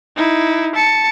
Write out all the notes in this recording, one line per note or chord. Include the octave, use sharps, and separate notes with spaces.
D#4 E4
A5 C#7